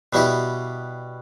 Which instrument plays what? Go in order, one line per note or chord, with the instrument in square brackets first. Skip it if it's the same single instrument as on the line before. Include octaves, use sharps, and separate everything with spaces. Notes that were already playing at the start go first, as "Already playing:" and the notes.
[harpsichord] B2 G3 B3 E4 G4